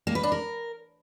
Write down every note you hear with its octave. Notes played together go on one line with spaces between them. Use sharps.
A#3
B4
D4
A#4